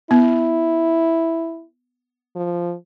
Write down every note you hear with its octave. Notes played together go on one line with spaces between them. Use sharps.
B3 E4
F3